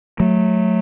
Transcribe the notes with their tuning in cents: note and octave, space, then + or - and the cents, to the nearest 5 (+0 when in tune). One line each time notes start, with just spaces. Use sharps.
F#3 -15 A3 -10